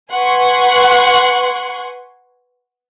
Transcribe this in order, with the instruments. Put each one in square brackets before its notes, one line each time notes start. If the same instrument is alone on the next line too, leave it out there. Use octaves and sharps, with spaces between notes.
[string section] B4 F#5 G#5 C6 C#6